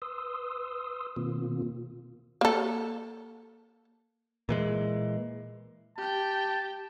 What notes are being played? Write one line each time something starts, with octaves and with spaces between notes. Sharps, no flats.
B4 C6 D#6 E6
B2 D#3 A#3 C4 F4
A#3 A4
A#2 E3 G#3
G4 G5 A5